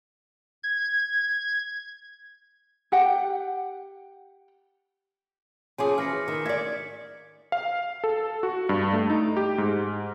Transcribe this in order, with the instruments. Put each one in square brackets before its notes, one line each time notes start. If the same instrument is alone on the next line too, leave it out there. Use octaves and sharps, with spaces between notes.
[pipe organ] G#6
[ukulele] G4 F#5 G5
[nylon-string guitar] F3 C#4 G#4 [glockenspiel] G#5 C6 D6
[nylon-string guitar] E3 [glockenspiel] F6 A#6 C#7
[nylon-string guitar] D#3
[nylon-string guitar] D5 E5 [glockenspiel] G#6 B6 C#7
[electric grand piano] F5
A4
F#4
G2
A3
D#4
G4
G#2